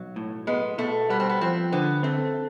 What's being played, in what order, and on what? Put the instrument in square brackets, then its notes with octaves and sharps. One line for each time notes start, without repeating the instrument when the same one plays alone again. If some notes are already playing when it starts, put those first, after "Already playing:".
Already playing: [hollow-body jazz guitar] B1 [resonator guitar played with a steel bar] F#3
[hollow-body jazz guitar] A2
[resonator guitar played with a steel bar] G#3 [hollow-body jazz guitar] B3
[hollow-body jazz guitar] B2 [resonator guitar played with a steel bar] A3
[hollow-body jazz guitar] G3 [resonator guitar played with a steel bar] B3
[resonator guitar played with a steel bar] C4
B3
[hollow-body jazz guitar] F3 [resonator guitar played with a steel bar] C4
[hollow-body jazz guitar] D3 [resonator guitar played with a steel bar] B3
[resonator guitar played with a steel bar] A3 [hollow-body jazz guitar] C4